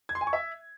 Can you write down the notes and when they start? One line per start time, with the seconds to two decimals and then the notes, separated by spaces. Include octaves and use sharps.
0.09 G#6
0.15 C6
0.21 G#5
0.27 C#6
0.33 E5